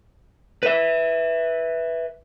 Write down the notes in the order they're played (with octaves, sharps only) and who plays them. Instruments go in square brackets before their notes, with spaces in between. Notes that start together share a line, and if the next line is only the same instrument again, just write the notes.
[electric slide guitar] B4 E5